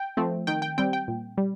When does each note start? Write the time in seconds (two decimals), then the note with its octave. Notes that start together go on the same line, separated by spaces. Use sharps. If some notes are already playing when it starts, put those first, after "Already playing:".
Already playing: G5
0.17 F3 A3 C4
0.47 D#3 G5
0.62 G5
0.78 G3 C4 G5
0.93 G5
1.08 A#2
1.38 G3